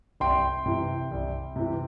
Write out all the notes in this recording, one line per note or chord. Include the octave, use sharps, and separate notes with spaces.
C2 G5 C6
C3 E3
C2
C3 E3